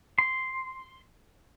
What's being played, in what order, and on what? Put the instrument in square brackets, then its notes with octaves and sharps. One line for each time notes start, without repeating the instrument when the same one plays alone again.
[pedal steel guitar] C6